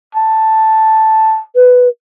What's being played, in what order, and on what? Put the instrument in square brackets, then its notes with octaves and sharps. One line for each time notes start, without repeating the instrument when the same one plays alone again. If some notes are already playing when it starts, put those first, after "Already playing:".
[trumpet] A5
[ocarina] B4